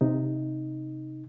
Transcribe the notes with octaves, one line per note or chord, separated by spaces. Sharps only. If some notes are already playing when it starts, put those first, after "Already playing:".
C3 D#4